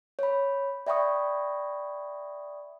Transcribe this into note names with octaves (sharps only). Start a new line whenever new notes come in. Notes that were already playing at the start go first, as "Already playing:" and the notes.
C#5 B5
D5 E5 G5 B5 C#6 D#6